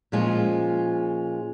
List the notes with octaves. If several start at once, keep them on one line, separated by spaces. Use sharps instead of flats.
A#2 F3 G#3 C#4 F4